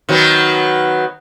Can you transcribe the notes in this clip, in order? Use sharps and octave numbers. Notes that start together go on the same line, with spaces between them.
D#3 F#3 B3